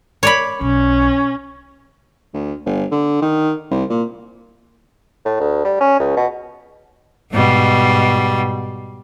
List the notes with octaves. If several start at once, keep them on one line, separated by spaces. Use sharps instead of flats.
C#5 D5 B5
B1 C#4
D2
G1
D3
D#3
C2
A#2
A2
D2
G3
C#4
C#2
B2
G#2 B2 G3